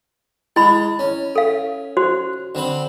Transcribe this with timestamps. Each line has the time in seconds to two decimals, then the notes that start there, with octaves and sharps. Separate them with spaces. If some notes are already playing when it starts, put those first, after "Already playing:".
0.56 G#3 E4 B5
0.99 C#4
1.36 A4 F5
1.97 F#4 C5
2.55 D3 C4 B5